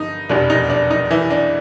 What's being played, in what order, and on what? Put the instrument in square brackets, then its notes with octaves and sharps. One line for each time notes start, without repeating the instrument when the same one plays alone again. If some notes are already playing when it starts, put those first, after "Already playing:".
Already playing: [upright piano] G1 G2 D#4
F1 E2 B2 G3 D4
D#4
D4
D#4
E3 E4
D4